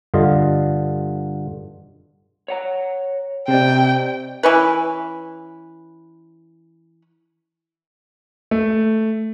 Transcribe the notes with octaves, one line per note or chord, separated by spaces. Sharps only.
G2 D3 F4 D#5
C#5 F#5 A#5
C3 C4 D5 D#5 G5
E3 C#4 B4
A3